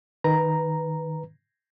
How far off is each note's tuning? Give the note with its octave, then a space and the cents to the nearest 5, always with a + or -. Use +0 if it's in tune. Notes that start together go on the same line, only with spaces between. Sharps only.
D#3 +0 B4 +0 A#5 +0